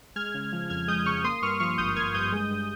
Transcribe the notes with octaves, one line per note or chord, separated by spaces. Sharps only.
G#3 F6 G#6
C#3
F3
F2 F6 G#6
G#3 D#6 G6
C#3 C#6 F6
A#3 C6 D#6
G2 C#6 F6
F3 C#6 F6
G#1 D#6 G6
A#3 F6 G#6
G2 D#6 G6
G#3
G2